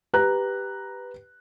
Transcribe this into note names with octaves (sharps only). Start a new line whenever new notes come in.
G4 B4 A#5 F#6